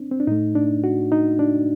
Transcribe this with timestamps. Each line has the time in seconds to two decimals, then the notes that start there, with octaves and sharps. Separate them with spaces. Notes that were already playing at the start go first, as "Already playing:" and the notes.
Already playing: C4 D4
0.11 C4
0.20 D4
0.27 A2 A3 D#4
0.55 D4
0.84 F#4
1.12 D#4
1.39 D4